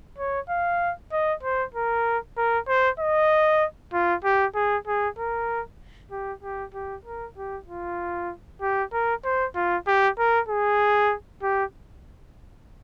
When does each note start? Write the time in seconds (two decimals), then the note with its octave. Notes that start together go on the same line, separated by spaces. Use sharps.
0.18 C#5
0.49 F5
1.12 D#5
1.43 C5
1.75 A#4
2.37 A#4
2.68 C5
3.00 D#5
3.93 F4
4.25 G4
4.55 G#4
4.87 G#4
5.18 A#4
6.12 G4
6.43 G4
6.74 G4
7.05 A#4
7.37 G4
7.68 F4
8.62 G4
8.93 A#4
9.25 C5
9.55 F4
9.87 G4
10.19 A#4
10.49 G#4
11.43 G4